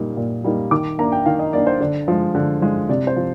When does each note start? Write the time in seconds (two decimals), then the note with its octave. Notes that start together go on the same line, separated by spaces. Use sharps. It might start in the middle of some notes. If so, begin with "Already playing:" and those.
Already playing: A#2 G3 A#3 D#4
0.17 A#2
0.44 G3 A#3 D#4
0.71 D#3 D6
0.99 A#3 D4 A#5
1.12 G5
1.26 D#3 F5
1.39 D#5
1.53 A#3 D4 D5
1.67 C5
1.80 D3 D5
2.08 F3 G#3
2.35 D3
2.62 F3 G#3
2.89 C3 D5
3.07 C5
3.16 F3